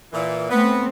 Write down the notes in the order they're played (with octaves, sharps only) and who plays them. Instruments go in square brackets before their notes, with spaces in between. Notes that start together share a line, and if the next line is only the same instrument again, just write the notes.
[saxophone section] A#2 E3
[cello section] A3 C4 [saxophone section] B3